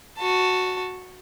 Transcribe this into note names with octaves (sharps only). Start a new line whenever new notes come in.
F#4 A5